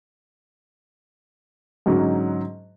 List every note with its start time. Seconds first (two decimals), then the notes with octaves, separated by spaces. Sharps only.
1.86 G#2 D3 F#3 C#4 D#4